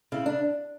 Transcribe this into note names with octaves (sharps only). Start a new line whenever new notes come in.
C#3 E4
D4